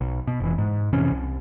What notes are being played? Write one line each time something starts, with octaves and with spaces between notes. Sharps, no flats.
B1
B2
F1 E3
G#2
F2 C3 E3 C#4
C2